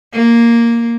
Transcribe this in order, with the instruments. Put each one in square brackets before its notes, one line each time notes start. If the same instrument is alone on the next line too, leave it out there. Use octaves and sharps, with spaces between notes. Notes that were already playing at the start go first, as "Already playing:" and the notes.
[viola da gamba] A#3